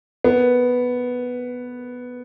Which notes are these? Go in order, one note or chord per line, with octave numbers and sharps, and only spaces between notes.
B3